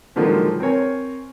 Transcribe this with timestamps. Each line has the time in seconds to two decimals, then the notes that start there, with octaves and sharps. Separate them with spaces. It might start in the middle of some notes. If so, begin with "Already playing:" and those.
0.16 A#2 D3 D#3 F3 F#3 G#3
0.60 C4 A#4 C#5 G#5